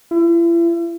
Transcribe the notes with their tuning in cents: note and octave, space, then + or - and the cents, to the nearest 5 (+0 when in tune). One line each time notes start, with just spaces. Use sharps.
E4 +40